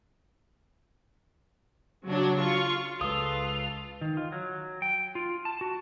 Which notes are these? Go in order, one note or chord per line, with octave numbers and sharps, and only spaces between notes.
C#3 F#3 D4
F4 C#6
C#2 G#3 F4 A4 B4 D#6
D#3
F4
F#3
G5
F4
A5
F#4